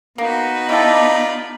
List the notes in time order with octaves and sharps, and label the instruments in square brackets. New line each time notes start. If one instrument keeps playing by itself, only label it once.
[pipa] A#3 [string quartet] B3 D#4 B5 [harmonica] F#4
[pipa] E4 G4 A4 [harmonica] F4 D5 [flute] D#5